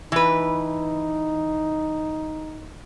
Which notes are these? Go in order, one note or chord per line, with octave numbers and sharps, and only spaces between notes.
E3 D#4 B4